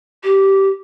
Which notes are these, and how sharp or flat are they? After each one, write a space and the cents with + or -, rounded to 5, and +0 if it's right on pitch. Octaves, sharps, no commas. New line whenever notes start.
G4 -15